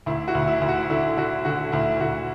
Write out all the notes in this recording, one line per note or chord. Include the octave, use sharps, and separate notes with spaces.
D2 E4
F#4
D2
E4
D2
F#4
D3 E4
D3 F#4
D3 F#4
D2 E4
D2 F#4